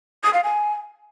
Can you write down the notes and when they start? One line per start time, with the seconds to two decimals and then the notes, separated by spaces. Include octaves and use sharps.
0.23 D#6
0.33 F5
0.43 G#5